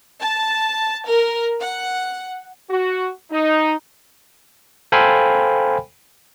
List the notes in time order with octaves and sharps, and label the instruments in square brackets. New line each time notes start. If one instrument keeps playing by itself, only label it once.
[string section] A5
A#4
F#5
[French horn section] F#4
D#4
[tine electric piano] A4 C5 F5 G5 G#5 B5